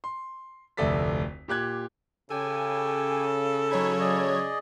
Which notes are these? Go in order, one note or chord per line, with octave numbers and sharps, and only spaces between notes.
C6
F1 D2 A4 D5 B6
A#2 G4 F#6 G#6
C#3 G4 A4 G5 G#5
F#3 D#4 C#5 B5 G#6
G#4 D5 D#5